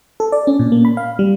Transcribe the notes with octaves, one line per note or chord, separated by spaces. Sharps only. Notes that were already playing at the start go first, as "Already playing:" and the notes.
A4
D5
C#4
A#2
A#3
B5
F5
G3